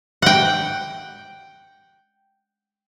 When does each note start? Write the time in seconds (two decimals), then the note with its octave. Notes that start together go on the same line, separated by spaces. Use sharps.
0.22 F#5 G5